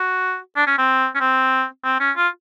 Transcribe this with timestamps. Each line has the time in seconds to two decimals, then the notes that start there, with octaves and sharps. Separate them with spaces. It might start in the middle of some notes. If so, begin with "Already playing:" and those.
Already playing: F#4
0.57 D4
0.67 C#4
0.78 C4
1.15 C#4
1.20 C4
1.84 C4
2.00 C#4
2.17 F4